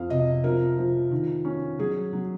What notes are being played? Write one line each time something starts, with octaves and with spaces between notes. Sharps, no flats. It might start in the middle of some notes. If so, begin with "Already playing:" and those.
Already playing: F2 F5
C3 D#5
F3 A#4
F3
D#3
C#4
F#3 G#4
F#3